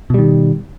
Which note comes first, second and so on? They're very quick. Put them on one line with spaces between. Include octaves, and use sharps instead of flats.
B2 G3 D#3